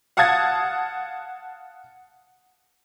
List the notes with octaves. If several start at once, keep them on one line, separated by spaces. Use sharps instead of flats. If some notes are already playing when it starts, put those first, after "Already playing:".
F5 F#5 A5 D#6 G#6 A6